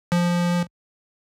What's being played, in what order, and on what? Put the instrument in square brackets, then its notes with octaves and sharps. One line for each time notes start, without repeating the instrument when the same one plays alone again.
[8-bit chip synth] F3